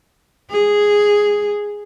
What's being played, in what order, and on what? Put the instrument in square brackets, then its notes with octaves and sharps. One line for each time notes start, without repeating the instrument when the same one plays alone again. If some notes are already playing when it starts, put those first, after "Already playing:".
[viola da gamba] G#4